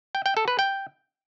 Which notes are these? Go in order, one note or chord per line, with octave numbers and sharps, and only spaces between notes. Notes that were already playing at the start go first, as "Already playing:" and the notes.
G5
G5
A4
B4
G5